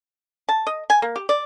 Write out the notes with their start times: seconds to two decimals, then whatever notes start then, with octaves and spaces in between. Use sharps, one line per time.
0.49 A5
0.67 D#5
0.90 G#5
1.02 A#3
1.16 G4
1.29 D5